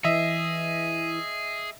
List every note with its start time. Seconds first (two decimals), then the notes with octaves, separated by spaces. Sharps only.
0.04 E3 G#4 D#5 E5